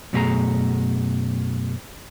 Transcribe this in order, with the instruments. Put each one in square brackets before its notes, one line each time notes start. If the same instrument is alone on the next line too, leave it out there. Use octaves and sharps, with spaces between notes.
[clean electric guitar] F#2 B2 A3 G4 G#4 A#5